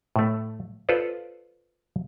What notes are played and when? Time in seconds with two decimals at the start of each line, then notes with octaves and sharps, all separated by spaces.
0.16 A2 A3
0.89 F4 A4 B4 C5 D5